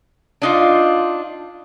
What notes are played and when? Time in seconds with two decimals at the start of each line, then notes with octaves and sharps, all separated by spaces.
0.42 D4 D#4 F4